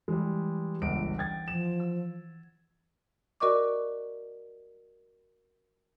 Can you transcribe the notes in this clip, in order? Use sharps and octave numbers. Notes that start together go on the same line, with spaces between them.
E3 G3 G#3
G1 C#2 F#5 D7
G5 G#6 A6
F3 E7
E6
F#4 A#4 D5 D#5 C#6 D6